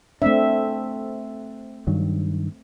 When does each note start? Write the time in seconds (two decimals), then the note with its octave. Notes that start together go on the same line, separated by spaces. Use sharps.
0.22 A3 C4 D4 E5
1.87 G2 D#3 F#3